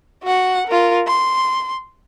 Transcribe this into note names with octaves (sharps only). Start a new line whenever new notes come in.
F#4 F#5
F4 A#4
C6